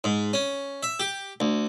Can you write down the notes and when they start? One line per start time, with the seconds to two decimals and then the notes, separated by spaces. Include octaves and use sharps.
0.04 G#2
0.33 C#4
0.83 E5
1.00 G4
1.40 D2